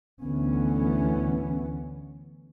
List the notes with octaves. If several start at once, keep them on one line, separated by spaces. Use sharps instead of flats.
D2 E3 B3 C#4